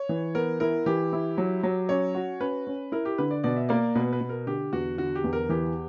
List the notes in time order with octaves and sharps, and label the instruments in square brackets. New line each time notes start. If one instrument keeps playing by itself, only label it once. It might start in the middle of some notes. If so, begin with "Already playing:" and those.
Already playing: [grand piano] C#5
[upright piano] E3
[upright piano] B3 [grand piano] A#4
[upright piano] E4 [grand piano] A#4
[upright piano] E3 [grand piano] G4
[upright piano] E4
F#3
F#3
[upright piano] C#4 [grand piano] C#5
[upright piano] F#4
[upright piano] C#4 [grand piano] B4
[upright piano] C#4
[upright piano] E4 [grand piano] A#4
[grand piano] G4
[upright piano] D3 [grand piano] B4
[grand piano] D5
[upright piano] B2 [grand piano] D5
[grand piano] E5
[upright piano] A#3 [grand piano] D5
[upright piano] B2 [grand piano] B4
[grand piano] B4
[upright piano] B2
[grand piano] A#4
[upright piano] D3 [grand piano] G4
[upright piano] E2 [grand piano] F#4
[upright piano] D3 [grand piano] F#4
[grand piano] G4
[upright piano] E2
[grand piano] A#4
[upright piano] E3 [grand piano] G4